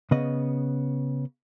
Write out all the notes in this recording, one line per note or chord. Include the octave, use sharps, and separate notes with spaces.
C#3 B3 D#5